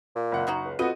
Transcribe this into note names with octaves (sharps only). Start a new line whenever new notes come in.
A#2
F#1 F#5
F#3 D#4 F#4
C#2
B3 C4 F4 F#4 A4 D#5 D#7